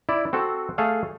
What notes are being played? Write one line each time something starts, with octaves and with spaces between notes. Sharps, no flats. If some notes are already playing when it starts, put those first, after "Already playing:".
E4 D5
C4 F#4 A4
A3 G#4 A4 F5